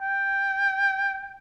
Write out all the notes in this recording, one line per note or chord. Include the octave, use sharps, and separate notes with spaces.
G5